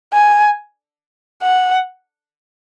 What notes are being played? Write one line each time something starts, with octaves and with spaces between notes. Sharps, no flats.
G#5
F#5